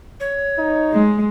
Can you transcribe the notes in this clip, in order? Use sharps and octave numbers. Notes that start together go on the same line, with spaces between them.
C#5
D#4
G#3